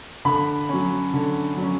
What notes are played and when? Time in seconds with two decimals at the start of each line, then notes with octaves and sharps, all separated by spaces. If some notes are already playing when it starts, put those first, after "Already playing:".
0.25 D3 B5
0.69 F#3 C#4
1.13 D3
1.57 F#3
1.62 C#4